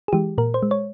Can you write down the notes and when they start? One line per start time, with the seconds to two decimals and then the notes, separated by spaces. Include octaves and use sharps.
0.08 G#4
0.13 E3 G#3 G4
0.38 A#2 A#4
0.54 C5
0.63 G#3
0.71 C#5